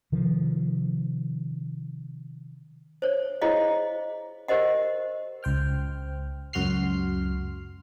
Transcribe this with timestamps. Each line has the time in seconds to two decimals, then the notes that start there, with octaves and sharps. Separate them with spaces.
0.12 C3 D#3 F3
3.02 C5 C#5
3.42 E4 G#4 C5 C#5 D#5 F5
4.48 G4 A#4 C5 D#5 F#5
5.43 C#2 C5 G5 F6
6.53 C#2 F#2 F#4 C6 F6 C7